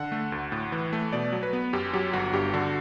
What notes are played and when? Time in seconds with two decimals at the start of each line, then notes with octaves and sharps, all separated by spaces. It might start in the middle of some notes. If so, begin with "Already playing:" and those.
Already playing: D3 F#5
0.12 A3
0.32 D2
0.52 A2
0.72 E3
0.93 A3
1.12 B2 D5
1.32 F#3
1.43 B4
1.53 B3
1.73 F#2 G4
1.93 F#3 G4
2.13 G1 F#4
2.33 G2 G4
2.54 D3 F#4